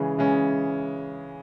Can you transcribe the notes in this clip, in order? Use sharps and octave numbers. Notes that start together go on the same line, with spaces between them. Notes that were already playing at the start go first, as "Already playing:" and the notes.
Already playing: C#3 E3 G#3 C#4
C#3 E3 G#3 C#4